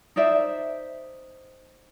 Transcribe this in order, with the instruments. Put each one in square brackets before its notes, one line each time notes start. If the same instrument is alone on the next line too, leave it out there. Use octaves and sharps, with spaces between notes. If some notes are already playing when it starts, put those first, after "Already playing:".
[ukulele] D#4 C5 D5 E5